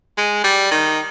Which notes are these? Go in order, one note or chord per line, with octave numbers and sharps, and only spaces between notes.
G#3
G3
D#3